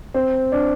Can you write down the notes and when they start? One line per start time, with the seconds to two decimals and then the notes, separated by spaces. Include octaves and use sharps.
0.14 C4
0.52 D4